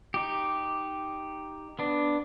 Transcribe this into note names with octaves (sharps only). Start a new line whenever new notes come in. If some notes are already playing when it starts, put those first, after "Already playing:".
D#4 G4
B3 D4